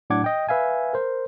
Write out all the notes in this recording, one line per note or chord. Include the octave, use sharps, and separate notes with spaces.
A2 F#3 D4 F#5 D6 G#6
D#5 G5
B4 E5 F5 G#5
A#4 C5